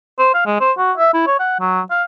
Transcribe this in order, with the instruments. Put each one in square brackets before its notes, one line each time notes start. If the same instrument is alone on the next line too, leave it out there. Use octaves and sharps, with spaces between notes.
[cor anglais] C5
F5
G#3
C5
F#4
E5
E4
C#5
F#5
F#3
F5